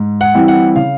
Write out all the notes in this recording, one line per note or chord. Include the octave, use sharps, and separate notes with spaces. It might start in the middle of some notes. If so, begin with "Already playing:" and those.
Already playing: G#2
F#5
E3 G3 C4 E4
F#5
C#3 F5